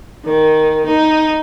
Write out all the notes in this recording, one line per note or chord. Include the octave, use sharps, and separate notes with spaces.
D#3
D#4